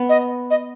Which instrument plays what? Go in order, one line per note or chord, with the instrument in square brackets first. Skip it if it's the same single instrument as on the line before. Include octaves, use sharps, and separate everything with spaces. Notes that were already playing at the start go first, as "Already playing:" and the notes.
Already playing: [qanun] B3
[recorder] D#5
D#5